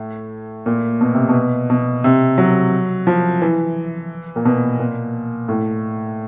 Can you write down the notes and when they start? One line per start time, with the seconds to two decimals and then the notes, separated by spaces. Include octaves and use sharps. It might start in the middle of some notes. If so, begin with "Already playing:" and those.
Already playing: A2
0.66 A#2
1.01 B2
1.14 C3
1.29 B2
1.70 B2
2.04 C3
2.38 F#3
3.07 F3
3.42 E3
4.36 A#2
4.45 B2
4.79 A#2
5.49 A2